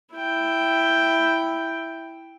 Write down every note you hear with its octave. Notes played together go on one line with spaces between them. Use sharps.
E4 G5